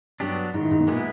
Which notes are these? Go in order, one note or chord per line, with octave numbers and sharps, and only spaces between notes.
G2 F#3 B3 D4 G4
G#2 D#3
A2
G#2
B2
A#2 G#3 B3 E4